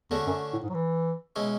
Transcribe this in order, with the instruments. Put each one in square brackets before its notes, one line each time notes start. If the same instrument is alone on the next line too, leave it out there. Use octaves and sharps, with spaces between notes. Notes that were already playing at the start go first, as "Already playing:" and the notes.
[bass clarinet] E2 [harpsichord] D3 A3 C#4 F#4
[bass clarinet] F#2
A2
G#2
F#3
E3
[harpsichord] B2 G#3 C#4 E4